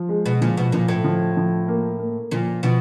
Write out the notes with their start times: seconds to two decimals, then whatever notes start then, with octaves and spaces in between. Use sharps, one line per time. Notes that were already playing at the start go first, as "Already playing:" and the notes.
Already playing: F3
0.09 G#3
0.26 B2
0.41 A#2 F3
0.57 B2
0.72 A#2 F3
0.88 A2
1.04 F3
1.37 F3
1.68 A#3
1.99 A#3
2.31 A#2 F3
2.63 B2 F3